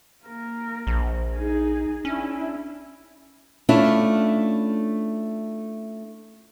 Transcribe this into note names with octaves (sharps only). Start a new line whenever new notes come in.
A#3 A#4
A#1
D#4 G#4
C#4 D4 E4
A3 C#4 D4 E4 F4